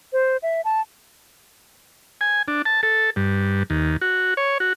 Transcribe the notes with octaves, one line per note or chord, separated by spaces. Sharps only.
C5
E5
A5
G#5
D4
A5
A4
G2
D#2
F#4
C#5
F#4